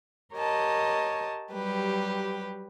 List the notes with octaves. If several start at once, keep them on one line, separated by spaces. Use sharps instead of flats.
G4 A#4 C#5 D#5 A5
F#3 G3 G4 B4